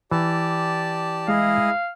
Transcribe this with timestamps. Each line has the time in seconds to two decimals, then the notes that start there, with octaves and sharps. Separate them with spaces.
0.11 E3 G4 D5 A5
1.28 G#3 E4 G#4 D#5 F5